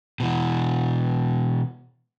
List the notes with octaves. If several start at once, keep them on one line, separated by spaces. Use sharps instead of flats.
B2 D#3 E3